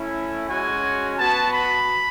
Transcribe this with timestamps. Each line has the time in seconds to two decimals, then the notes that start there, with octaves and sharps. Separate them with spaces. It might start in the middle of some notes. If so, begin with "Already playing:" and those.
Already playing: A3 C#4 E4
0.49 G#3 C#4 F#4 G#5
1.19 B3 F#4 A5
1.52 B5